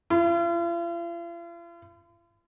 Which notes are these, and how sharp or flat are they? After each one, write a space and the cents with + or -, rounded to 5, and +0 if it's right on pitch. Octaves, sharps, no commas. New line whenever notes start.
F4 -45